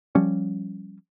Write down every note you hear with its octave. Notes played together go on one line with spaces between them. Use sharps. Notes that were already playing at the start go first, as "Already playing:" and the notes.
F3 G3 C#4